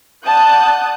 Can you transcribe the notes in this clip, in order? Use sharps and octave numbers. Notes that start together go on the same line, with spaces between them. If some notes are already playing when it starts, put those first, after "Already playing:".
D5 F#5 A5 D#6 F#6 G6